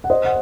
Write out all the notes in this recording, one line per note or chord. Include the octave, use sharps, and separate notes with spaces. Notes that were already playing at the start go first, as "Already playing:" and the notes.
F#5
C5 D#5
F#5